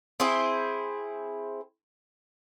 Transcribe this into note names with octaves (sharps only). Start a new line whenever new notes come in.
C4 E4 G#4 C5